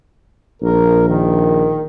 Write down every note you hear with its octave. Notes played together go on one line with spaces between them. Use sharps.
A#1 A#4
D#3